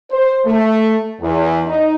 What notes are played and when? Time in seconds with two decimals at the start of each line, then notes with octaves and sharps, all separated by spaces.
0.11 C5
0.46 A3
1.21 E2
1.66 D#4